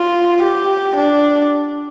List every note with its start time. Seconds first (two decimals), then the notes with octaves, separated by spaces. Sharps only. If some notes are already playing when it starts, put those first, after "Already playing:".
Already playing: F4
0.42 G4
0.96 D4